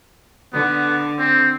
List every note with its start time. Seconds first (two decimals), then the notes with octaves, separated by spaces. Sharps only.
0.54 D3 B3
1.19 C4